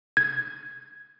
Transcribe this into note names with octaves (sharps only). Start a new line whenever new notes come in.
G#6